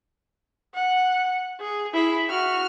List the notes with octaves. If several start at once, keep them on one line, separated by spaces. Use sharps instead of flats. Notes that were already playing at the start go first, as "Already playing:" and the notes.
F#5
G#4
E4 G#4
F#4 F6